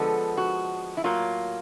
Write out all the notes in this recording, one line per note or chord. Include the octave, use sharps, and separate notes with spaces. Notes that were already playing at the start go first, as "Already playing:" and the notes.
Already playing: D3 F3 G#3 B3 A4
F#4
E4
A2 F#3 A#3 F4